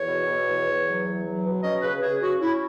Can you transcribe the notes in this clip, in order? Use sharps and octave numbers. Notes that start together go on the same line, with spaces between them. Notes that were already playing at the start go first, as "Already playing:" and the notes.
Already playing: E2 C#5
B2
B2
E2
E2
F#3
E2
F#3
B2
C#4 D#5
C#3 B4
C#3 G#4
C#4 F#4
C#4 E4